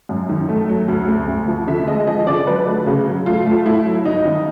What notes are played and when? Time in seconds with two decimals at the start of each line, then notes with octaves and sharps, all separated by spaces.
0.09 F#2
0.29 D#3
0.49 A3
0.69 F#3
0.88 D2
1.08 D2
1.28 D2
1.48 F3
1.67 D3 E5
1.87 G#3 D#5
2.07 F3 D#5
2.27 D3 D5
2.47 F#3 B4
2.67 A3
2.86 C#3 F#4
3.07 F#3
3.26 A3 F4
3.46 A3
3.65 A3 E4
3.85 F#3
4.05 G1 D#4
4.25 D#3